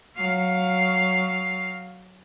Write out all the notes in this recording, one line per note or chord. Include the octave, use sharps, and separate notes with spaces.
F#3 F5